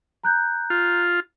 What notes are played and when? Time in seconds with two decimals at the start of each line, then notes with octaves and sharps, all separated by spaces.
0.24 A#5 F#6 G6
0.70 F4